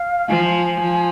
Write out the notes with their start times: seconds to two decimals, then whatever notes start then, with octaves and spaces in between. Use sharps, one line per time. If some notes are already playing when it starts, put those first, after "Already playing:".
Already playing: F5
0.29 F3 G#5
0.81 F3